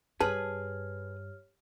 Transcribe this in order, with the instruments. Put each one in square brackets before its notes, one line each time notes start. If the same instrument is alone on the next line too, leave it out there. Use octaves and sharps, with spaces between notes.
[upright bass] G2 [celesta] G4 C#5 F6 [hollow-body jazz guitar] G#4 B4 [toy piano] A5